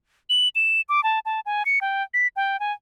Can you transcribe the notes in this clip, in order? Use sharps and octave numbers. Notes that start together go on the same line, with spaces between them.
F#7
E7
D6
A5
A5
G#5
C#7
G5
B6
G5
G#5